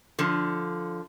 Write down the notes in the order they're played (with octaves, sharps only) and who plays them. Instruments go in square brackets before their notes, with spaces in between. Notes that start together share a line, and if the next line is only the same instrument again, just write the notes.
[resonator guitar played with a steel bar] D3 F3